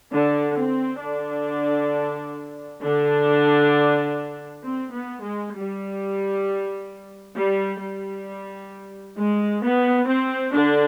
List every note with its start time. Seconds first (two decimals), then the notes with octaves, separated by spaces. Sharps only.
0.11 D3 D4
0.57 C4
1.02 D3 D4
2.83 D3 D4
4.65 C4
4.95 B3
5.24 G#3
5.56 G3
7.37 G3
7.82 G3
9.18 G#3
9.64 B3
10.08 C4
10.54 D3 D4